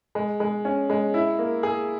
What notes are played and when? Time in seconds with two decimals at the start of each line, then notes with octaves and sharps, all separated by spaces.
0.15 G#3
0.40 G#3
0.65 C#4
0.90 G#3
1.14 E4
1.39 A#3
1.63 G#4